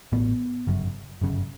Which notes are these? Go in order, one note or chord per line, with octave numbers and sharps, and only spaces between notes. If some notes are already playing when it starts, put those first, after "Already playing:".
A1 A2 B3
G1 F#2 C#3
G1 F#2 C#3